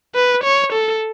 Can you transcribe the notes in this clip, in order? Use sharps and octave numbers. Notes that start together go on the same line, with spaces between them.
B4
C#5
A4